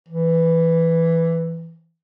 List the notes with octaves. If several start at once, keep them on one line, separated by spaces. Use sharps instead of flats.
E3